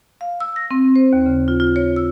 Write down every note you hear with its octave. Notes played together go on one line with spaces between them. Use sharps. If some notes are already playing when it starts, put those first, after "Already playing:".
F5
E6
A#6
C4
C5
D#2
C#3
F4
F4
C#5
E6